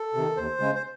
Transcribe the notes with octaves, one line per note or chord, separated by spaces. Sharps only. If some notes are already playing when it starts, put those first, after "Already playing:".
Already playing: A4
C3 D#3
D#2 C5
C#3 G#3
C5